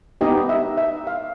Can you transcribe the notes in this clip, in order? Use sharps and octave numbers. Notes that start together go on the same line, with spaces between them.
B3 D#4 G4 D#5
E5
E5
F5